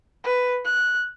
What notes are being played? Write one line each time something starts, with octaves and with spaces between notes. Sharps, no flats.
B4
F#6